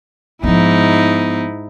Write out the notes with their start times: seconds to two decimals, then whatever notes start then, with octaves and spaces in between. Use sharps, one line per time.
0.44 G#2 F3 B3 D#4 E4